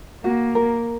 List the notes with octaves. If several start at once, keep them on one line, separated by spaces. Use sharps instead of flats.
A#3 F#4
A#4